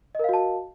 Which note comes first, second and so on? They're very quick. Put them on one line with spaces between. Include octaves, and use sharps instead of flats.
D#5 A#4 F5 F#4 A5